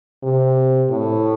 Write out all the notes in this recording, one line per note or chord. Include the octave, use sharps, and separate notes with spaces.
C3
A2